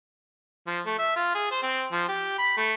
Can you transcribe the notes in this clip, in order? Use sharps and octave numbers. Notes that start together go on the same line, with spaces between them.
F3
A3
E5
F4
G#4
C5
C4
F3
G4
B5
A3